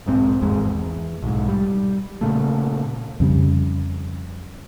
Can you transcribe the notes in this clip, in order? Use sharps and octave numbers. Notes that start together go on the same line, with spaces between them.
B1 G#2 C4
G#1 E2 G#2 G#3
E2
B1 G#2
G3
A#2 C#3 A3
F2 C#3 G3